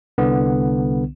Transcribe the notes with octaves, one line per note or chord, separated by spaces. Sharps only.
C2 D3 B3